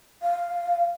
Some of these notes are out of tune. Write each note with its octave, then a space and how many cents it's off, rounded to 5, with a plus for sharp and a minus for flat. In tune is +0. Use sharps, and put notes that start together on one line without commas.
F5 -5